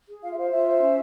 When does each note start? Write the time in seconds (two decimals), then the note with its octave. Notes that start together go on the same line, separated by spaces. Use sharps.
0.08 G#4
0.23 F4 F5
0.31 E5
0.37 C5 F5
0.51 F4 E5
0.66 C5
0.81 C#4